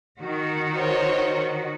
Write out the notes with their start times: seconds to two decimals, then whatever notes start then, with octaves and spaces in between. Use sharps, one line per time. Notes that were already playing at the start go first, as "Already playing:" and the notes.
0.19 D#3 F#4
0.74 C5 C#5